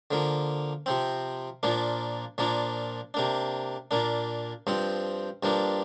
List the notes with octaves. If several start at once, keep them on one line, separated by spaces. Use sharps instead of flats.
D3 F3 A#3
C3 F3 C4
A#2 F3 A#3 D4
A#2 F3 A#3 D4
C3 A#3 D4
A#2 A#3 D4
G2 F3 C4
G2 F3 A#3 D4